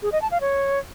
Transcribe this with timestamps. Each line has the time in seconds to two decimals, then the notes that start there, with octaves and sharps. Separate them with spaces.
0.02 G#4
0.12 D#5
0.22 A5
0.31 F5
0.41 C#5